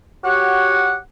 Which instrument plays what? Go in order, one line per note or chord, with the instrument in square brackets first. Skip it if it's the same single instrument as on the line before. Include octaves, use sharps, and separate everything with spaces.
[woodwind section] F#4 G4 C#5 F#5